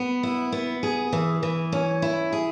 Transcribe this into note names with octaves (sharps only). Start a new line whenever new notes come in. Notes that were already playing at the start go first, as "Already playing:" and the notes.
Already playing: B3
E4
B3
G#4
E3
E3
C#4
E4
G#4